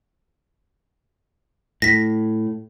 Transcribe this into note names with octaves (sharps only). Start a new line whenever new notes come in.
A2 A#6 B6